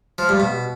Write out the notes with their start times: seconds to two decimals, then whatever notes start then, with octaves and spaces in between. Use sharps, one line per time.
0.18 F3
0.29 G2
0.40 B2